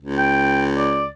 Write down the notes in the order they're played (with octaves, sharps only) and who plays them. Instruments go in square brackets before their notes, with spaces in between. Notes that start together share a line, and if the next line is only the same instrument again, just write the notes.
[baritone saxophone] C#2
[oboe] G5
D5